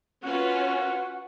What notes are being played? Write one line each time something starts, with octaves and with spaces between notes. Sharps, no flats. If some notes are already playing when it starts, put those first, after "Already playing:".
C#4 F4 F#4 B4